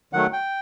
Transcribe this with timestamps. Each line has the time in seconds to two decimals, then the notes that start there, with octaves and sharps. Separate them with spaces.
0.13 D#3 F#3 A3 F#5
0.33 G5